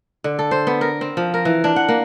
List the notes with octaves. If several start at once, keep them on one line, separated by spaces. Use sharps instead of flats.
D3
A4
C5
B3
A#4
C4
F3
A#4
E3
D4
F#5
A#3